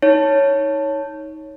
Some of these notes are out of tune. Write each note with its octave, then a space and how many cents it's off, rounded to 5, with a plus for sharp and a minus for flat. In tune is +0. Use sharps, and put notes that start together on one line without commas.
D#4 +20 C#5 +0